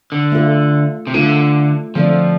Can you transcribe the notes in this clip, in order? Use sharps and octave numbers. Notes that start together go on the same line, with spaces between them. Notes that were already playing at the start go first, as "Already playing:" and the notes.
D3
A3 F4 A4
C3
D3 A3 F4 A4
D3 F3 A3 C4 A4 D5